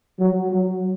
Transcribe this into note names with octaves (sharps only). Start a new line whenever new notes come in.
F#3
F#3